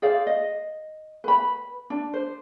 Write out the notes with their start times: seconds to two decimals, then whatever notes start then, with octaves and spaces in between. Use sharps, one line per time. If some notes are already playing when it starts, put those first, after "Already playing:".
0.02 G#4 C5 D5 F5
0.27 D#5
1.24 B4 B5
1.90 D4
2.13 C5